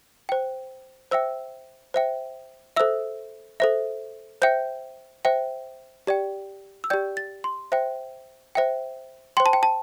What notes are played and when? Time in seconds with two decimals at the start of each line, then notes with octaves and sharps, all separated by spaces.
0.29 C5 G5
1.11 C5 E5 G5 E6
1.94 C5 E5 G5
2.76 A4 C5 E5 E6
3.60 A4 C5 E5
4.42 C5 E5 G5 G6
5.25 C5 E5 G5
6.07 G4 D5 G5
6.84 E6
6.90 G4 D5 G5 G6
7.17 A6
7.44 C6
7.72 C5 E5 G5
8.55 C5 E5 G5
9.37 C5 G5 C6
9.46 A5
9.53 G5
9.63 A5